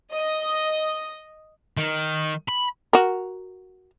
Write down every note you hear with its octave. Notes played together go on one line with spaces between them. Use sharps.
D#5
D#3
B5
F#4 A#4